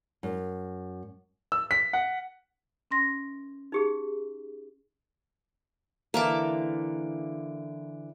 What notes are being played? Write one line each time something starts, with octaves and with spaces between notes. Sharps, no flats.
F#2
E6
B6
F#5
C#4 C6 A#6
D#4 G4 G#4
D3 E3 A#3 A5 D6